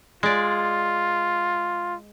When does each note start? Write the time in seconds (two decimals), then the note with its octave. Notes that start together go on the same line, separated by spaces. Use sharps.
0.23 G#3 F4 D5